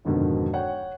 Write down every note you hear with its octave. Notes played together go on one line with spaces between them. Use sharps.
F2 G#2 B2 D3 D#3
C#5 F#5 G5